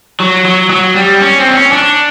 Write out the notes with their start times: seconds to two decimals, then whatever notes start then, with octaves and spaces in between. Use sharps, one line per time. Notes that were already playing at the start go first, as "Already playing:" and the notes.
0.20 F#3
0.45 F#3
0.70 F#3
0.95 G3
1.21 C#4
1.39 C4
1.48 D4
1.56 C#4
1.73 D4